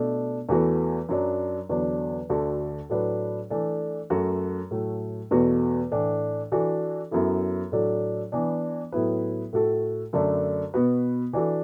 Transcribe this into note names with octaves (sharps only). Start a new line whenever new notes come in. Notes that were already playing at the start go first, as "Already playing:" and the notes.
Already playing: B2 A3 D4
E2 E3 A3 F#4 B4
F#2 F#3 D4
E2 D3 F#3 D4
D2 D3 A3 F#4
A2 F#3 D4 B4
E3 A3 D4 A4
F#2 F#3 A3 F#4
A2 F#3 A3
E2 B2 A3 F#4 B4
A2 E3 D4
E3 D4 F#4 A4
F#2 F#3 B3 E4 A4
A2 F#3 D4 A4
E3 B3 D4
A2 F#3 B3 E4 B4
A2 A3 F#4 A4
F#2 D3 A3 D4
B2 B3 F#4 B4
E3 D4 F#4 A4